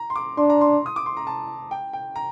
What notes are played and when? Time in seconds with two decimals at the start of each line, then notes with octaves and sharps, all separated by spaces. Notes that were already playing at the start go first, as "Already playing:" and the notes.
Already playing: A#5
0.10 C6
0.16 D6
0.37 D4 C6
0.50 A#5
0.61 C6
0.86 D#6
0.96 D6
1.06 C6
1.17 A#5
1.27 A5
1.71 G5
1.93 G5
2.16 A#5